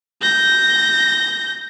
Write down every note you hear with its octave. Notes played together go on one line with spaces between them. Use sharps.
G6 A#6